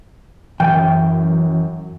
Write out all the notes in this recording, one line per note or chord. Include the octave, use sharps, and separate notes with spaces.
F#2 E3 G5